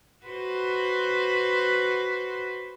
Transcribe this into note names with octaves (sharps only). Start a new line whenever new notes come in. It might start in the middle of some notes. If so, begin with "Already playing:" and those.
F#4 B4 C5